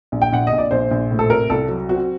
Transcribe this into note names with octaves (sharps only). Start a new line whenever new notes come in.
A#1
G5
A#1 F#5
D#5
A#1
D5
A#1 C5
A#1
A2
A4
C3 A#4
C2 A4
F#3
C4 F#4